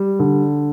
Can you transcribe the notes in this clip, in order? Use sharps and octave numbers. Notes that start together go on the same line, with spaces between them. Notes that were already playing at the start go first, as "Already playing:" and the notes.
Already playing: G3
D3